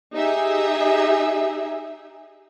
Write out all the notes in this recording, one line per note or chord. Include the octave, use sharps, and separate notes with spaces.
D#4 G4 G#4 E5